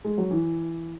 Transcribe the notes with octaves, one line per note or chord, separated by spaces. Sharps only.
G#3
F#3
E3